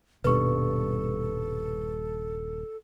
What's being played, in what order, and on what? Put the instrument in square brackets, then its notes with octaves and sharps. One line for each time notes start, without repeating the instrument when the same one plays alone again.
[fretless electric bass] D#1 G2 [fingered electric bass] B2 [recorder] A4 [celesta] B4 C#6